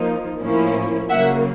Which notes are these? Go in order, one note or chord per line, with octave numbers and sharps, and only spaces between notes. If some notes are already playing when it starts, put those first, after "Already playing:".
Already playing: F3 A#3 D#4
A2 F3 A#3 C#4 E4
C#3 F#3 A#3 E5 F#5